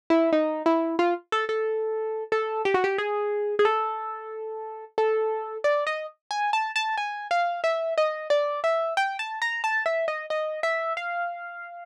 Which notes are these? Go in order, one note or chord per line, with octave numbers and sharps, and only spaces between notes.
E4
D#4
E4
F4
A4
A4
A4
G4
F#4
G4
G#4
G#4
A4
A4
D5
D#5
G#5
A5
A5
G#5
F5
E5
D#5
D5
E5
G5
A5
A#5
A5
E5
D#5
D#5
E5
F5